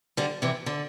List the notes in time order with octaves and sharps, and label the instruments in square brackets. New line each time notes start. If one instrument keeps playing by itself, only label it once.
[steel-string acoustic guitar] D3 G3
C3 E3
D3